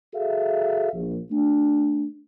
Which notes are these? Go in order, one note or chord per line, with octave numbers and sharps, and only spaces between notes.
F#4 G#4 A4 E5 F5
A#1
A3 D4